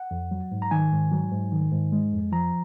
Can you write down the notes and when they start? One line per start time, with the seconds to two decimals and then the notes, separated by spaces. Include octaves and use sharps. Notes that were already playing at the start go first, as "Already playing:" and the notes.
Already playing: F#5
0.11 F2
0.31 F#3
0.52 G#2
0.62 A#5
0.71 D#3 G#5
0.92 G#2
1.12 F#3
1.32 G#2
1.52 D#3
1.72 G#2
1.92 G#3
2.12 F2
2.32 F3 A#5